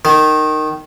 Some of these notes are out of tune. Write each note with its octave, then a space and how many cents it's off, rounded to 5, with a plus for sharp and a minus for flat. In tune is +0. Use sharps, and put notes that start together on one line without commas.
D#3 -10